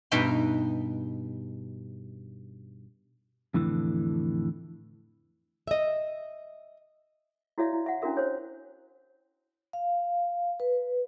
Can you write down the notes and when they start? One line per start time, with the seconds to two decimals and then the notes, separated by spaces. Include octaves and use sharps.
0.12 G2 B2 D#4 E5 G5 C6
3.54 F2 A2 D3 E3
5.67 D#5 E5
7.58 E4 F#4 C#5 D5 E5 F5
7.73 E4
7.86 E5 F#5
8.02 C#4 D4 E4 F#4 A#4 E5
8.17 C5 C#5
9.73 F5
10.60 B4